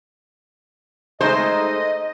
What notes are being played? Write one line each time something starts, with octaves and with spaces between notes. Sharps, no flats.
G#3 A3 D#4 C5 D#5